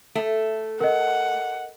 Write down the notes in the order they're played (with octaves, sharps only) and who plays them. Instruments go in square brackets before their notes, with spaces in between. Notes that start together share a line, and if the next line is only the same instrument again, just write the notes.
[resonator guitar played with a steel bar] A3
[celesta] A#4 D#5 [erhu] F#5